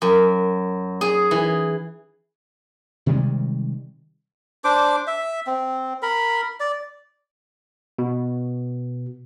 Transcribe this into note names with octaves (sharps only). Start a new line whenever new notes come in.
F#2
G#4
E3
C3 D#3 G3 G#3
D4 C5 D6
E5
C4
A#4 B5
D5
B2